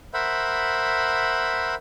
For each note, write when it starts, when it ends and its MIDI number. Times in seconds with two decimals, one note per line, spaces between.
0.14 1.75 70
0.14 1.75 72
0.14 1.75 76
0.14 1.75 78
0.14 1.75 83